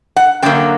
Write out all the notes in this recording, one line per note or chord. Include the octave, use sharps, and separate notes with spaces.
F#5
F#2 D3 F#3 A#3 G5